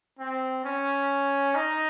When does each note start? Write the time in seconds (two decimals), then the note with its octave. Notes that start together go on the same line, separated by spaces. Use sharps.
0.19 C4
0.64 C#4
1.55 D#4